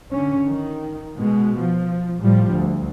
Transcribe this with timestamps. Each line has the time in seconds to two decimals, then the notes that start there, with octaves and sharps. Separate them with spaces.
0.11 D3 C#4
0.47 D#3
1.18 B2 G#3
1.59 F3
2.19 A2 F3 G3
2.49 D2